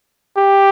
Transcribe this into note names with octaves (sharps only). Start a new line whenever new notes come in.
G4